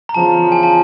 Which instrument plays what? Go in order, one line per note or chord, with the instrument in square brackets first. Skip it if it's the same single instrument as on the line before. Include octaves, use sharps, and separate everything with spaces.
[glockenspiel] A#5
[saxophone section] E2 C#3 F3 [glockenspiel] A5
[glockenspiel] G#5
A5